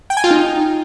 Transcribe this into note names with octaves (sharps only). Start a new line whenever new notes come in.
G5
G#5
F4
D#4